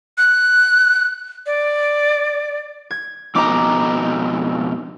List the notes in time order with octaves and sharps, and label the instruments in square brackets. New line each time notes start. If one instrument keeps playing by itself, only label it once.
[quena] F#6
D5
[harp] G#6
[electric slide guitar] F2 B2 D#4 [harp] A#5 D6